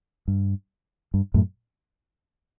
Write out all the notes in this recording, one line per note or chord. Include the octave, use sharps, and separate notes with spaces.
G2
G2
F#2 A2